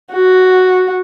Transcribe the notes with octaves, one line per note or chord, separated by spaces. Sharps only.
F#4